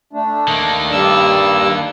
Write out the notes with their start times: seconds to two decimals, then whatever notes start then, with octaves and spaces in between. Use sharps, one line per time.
0.13 A3 D4
0.48 D#3 A#3
0.92 G2 G3 D5 E6